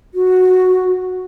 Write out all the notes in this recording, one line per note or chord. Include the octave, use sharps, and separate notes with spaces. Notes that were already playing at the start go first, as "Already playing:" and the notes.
F#4